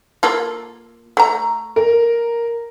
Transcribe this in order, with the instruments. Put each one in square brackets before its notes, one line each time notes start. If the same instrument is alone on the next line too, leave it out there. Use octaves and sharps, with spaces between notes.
[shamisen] A#3 F4 A4
A3 A#5
[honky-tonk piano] A#4